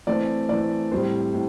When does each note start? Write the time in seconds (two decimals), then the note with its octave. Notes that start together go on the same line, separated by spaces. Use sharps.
0.07 E3 A3 C4 D5
0.49 E3 A3 C4 D5
0.92 A2 G3 C4 C5
1.34 A2